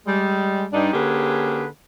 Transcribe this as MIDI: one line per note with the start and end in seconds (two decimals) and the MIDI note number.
0.06 0.65 55
0.06 0.65 56
0.72 0.90 43
0.72 0.90 62
0.72 0.90 63
0.93 1.65 50
0.93 1.65 58
0.93 1.65 61
0.93 1.65 67
0.93 1.65 68
0.93 1.65 71